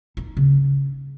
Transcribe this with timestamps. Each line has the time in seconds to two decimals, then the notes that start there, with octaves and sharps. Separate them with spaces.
0.17 D#4
0.37 C#3